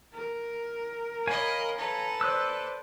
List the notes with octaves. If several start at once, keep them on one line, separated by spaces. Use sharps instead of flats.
A#4
C#5 D#5 F5 G#5 B5
A4 B4 A#5
C5 D5 E6 F#6